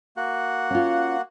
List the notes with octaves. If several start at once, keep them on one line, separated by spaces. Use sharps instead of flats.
A#3 F#4 F#5
C#4 F4